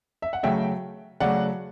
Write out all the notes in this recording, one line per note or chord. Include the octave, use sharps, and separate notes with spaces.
E5
F#5
C#3 F#3 A3 E5 G5
C#3 F#3 A3 D5 F#5